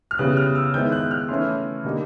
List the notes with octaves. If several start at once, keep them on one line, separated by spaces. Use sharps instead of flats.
F6
C#3 E3 G3 B3 F#6
F6
E6
D#3 G#3 B3 E4 G6
F#6
F6
E3 A3 C#4 E4 C6
D3 G3 A#3 D#4